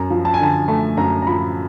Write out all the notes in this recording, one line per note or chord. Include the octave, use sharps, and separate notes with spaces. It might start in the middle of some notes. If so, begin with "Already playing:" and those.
Already playing: F#2 A#5
F3
A5
G#5
D3 A5
A3 A5
F#2 A#5
A#5
F3 B5